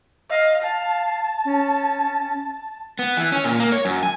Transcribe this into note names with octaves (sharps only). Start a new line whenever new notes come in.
D#5 F5
F5 A5
C#4
B3
E3
C#4
A#2
A#3
C#5
F#2
G#5